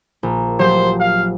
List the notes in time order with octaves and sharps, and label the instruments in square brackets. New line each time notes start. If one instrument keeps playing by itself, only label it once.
[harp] A#1
[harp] F3 F#3 G4 [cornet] C5
[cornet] F5